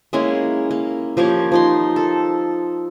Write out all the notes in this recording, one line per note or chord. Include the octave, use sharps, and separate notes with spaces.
G#3 A#3 C#4 E4
A#3
F3 A#3 G4 C#5
F3 D#4 C6
A4